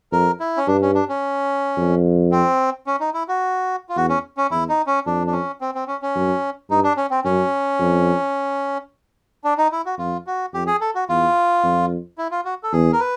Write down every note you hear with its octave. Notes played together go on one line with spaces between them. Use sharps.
F2 A#4
E4
C#4
G2 D4
C#4
D4
C#4
F2
C4
C#4
D#4
E4
F#4
F4
E2 F#4
C#4
C#4
E2 E4
D#4
C#4
F2 D4
D4
C#4
C4
C4
C#4
C#4
F#2
G2 D#4
D4
C#4
C4
F#2 C#4
F2
D4
D#4
E4
F#4
F2 F4
F#4
F2 G4
G#4
A4
F#4
E2 F4
F2
E4
F4
F#4
A4
E2 G#4
A#4
B4